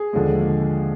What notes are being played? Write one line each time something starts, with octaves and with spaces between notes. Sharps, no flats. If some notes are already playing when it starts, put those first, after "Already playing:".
Already playing: G#4
D#2 D3 F3 G#3